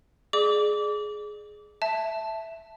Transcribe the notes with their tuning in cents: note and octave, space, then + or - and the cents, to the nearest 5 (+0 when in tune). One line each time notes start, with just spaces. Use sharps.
G#4 +15 D5 +25 D6 -25
E5 +0 A5 +0